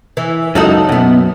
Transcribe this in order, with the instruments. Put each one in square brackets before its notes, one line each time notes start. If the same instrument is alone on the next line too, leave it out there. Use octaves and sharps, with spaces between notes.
[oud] E3
[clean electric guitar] C#2 F#2 [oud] D#4 F#4 A4
[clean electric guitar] F#2 [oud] B2 B3